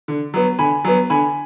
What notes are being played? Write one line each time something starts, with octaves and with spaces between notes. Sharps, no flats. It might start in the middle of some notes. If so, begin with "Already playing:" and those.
D3
F#3 B3
D3 G#5 B5
F#3 B3
D3 G#5 B5